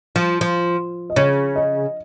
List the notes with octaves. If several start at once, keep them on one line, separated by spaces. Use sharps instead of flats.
F3
F3
D#5
C#3 C#5
D#5